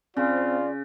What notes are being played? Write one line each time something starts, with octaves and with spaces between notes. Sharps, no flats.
C#3 C4 F4 D5